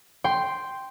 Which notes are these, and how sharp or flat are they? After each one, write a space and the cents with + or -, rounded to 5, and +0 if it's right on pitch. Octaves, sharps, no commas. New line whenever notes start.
G5 +0 C6 +0